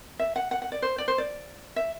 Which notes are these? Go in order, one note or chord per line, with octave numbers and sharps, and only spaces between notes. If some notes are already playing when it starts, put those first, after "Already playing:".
E5
F#5
F#5
F#5
D5
C5
D5
C5
D5
E5